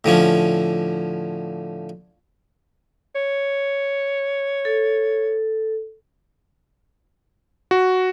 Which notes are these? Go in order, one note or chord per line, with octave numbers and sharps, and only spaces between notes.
A2 D3 F3 C#4
C#5
A4
F#4